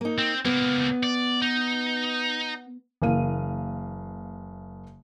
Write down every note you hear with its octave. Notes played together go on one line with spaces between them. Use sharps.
A#3 D#4
C4
C#2 A#3 B3
D5
D#4
F#1 E3 A#3 F5 D#7